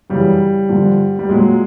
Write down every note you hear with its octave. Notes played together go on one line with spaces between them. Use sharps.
F#2 C#3 E3 G3
G2 D3 F3
G3
A#2 F#3 G#3